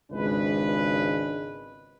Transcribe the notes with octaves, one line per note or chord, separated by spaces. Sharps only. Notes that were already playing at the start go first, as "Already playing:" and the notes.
G#1 C#2 C#3 G#3 D4 B4